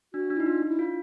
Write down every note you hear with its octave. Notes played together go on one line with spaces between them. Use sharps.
D4 F#4
D4
D#4 E4
D4 F4
D4
E4
F4